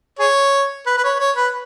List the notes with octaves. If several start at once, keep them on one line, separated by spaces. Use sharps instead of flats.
G#4 C#5
B4
B4
C#5
C#5
B4